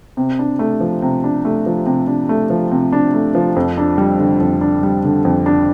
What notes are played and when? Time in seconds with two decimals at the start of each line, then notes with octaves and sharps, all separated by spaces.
0.17 C3
0.39 D4
0.59 A3
0.80 F3
1.02 C3
1.24 D4
1.45 A3
1.66 F3
1.86 C3
2.07 D4
2.29 A3
2.50 F3
2.71 C3
2.92 D4
3.14 A3
3.35 F3
3.56 F2
3.78 D4
3.98 G3
4.19 D3
4.40 F2
4.61 D4
4.83 G3
5.05 D3
5.25 F2
5.46 D4